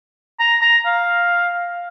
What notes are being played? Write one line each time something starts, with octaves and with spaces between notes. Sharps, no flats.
A#5
A#5
F5